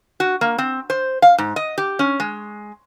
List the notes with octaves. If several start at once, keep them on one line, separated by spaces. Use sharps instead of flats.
F#4
A#3
C4
C5
F5
G#2
D#5
G4
C#4
G#3